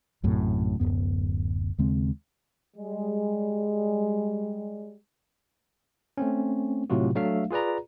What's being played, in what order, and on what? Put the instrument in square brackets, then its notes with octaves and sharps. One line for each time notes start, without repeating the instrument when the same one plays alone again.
[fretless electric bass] A#1 F#2 A2 C3
D1 G1 F#2 B3
D#2 C#3 G#3 C4
[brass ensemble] G3 G#3
[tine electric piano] A3 C4 C#4
A2 C3 F#3 F4 F#4
F#3 A3 D4 E5 F5
F4 G#4 B4 D5 A#5